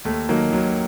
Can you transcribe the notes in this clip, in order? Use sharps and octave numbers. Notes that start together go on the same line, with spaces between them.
D#2 A3
D#3 F#3 A#3
D#2 F#3